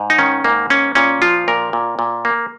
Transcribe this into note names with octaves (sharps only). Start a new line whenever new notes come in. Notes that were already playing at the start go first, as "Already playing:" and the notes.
Already playing: G#2
D#4
D#3 C#4
G#2 A#3
A#3 C#4
A#2 C#4
F3 F4
A#2 A#4
A#2
A#2
A#3